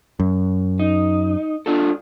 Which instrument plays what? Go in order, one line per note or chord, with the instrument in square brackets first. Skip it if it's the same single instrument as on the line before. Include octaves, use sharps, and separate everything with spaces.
[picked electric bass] F#2
[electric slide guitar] D#4
D4 F4 A4